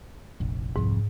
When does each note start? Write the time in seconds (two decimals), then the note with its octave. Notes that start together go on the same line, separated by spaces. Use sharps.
0.40 F1 A#1
0.76 C2 F2 G#2